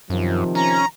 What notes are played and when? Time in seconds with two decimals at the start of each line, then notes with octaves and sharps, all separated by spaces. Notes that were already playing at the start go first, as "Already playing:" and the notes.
0.10 F#2 C3 D#3 F3
0.55 C#4 A#5